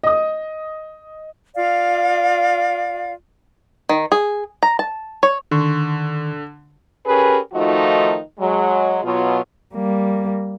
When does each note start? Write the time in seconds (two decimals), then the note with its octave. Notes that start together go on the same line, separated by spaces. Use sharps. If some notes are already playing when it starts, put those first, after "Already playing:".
0.03 D#5 D#6
1.55 F4 D5 F5
3.89 D#3
4.12 G#4
4.63 A#5
4.79 A5
5.23 C#5
5.51 D3 D#3 C6 C#6
7.06 C#4 G4 G#4 A#4 B4
7.54 D#3 F3 A3 D#4 F4 F#4
8.39 F#3 G#3
9.04 B2 F#3 F4
9.75 G3 A#3